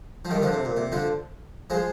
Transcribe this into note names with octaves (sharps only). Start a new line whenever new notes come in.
F3
D#3 G3
D3 F3
C3
A#2
C3
D3 F3
F3 G#3